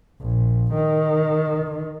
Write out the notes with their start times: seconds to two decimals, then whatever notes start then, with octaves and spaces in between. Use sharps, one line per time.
0.21 A#1
0.74 D#3